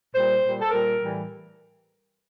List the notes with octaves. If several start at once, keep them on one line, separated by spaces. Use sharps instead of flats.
A#2 G3 C5
A#2 G3
A4
A#2 G3 A#4
A2 E3 G3